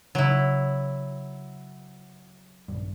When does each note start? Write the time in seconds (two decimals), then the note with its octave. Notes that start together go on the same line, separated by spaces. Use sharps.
0.15 C#3 F#3 E4
2.68 A#1 G2